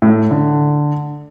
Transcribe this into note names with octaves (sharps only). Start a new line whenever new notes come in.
A2
D3